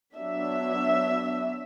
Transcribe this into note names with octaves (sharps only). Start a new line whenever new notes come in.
F#3 B3 D4 E5